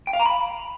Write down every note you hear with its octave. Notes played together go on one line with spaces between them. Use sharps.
G5
F5
A#5
B5